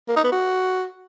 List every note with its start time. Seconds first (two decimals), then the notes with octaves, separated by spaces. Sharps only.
0.08 A#3
0.16 D#4
0.24 B3
0.32 F#4